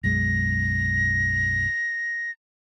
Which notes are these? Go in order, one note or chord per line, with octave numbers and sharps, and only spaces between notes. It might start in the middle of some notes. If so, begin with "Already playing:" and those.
B1 F#2 G#3 A#6